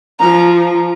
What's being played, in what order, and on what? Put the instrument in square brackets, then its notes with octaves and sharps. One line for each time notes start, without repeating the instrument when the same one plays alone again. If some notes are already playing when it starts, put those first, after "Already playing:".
[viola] F3 [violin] A#5